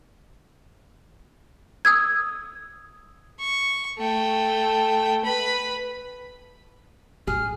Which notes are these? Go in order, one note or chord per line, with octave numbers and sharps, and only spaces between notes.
D#6 E6 G#6
C#6
A3 G5
B4 B5
A2 G3 G#4 F6